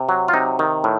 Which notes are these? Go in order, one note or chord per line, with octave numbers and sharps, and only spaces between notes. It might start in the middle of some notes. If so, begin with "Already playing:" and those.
Already playing: C3
F#3
F4
C3 D#4
D#3
A2